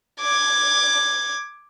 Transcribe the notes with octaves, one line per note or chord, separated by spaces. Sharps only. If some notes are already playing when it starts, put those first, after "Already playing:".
D6 G#6